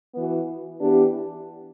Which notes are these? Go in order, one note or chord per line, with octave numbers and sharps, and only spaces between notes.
E3 B3 F#4
E3 B3 D4 G4